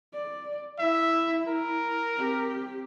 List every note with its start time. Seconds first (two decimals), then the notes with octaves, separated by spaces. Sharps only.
0.13 D5
0.79 E4 E5
1.48 A#4
2.16 C4 G4